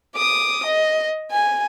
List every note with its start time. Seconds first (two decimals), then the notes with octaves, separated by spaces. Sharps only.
0.15 D6 D#6
0.66 D#5
1.31 G#5